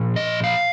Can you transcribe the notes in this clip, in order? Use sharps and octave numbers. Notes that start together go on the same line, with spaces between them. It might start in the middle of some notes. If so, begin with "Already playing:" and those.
Already playing: A#2 F3
D#5
F5